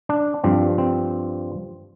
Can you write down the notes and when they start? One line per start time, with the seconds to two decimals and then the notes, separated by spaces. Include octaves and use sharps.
0.09 D4
0.44 G2 F3 C4
0.78 C4